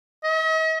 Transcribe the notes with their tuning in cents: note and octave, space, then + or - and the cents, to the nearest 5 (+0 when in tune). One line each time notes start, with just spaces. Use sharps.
D#5 +45